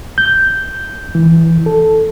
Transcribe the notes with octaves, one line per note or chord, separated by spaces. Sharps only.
G6
E3
A4